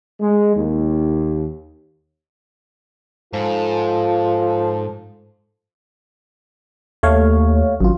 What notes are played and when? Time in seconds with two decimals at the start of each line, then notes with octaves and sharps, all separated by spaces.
0.21 G#3
0.56 D#2
3.33 G#2 F3 F4 A4
7.03 D#2 A3 C#5 F5
7.80 G#1 F#2 F4